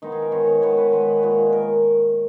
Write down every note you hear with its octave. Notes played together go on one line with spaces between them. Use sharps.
D#3 G#3 B3 D#4
G#4
A#4
D#3 G#3 B3 C#5
C#5
D#3 G#3 B3 C#5
B4
D#3 G#3 B3 B4
A#2 G#3 B3
A#4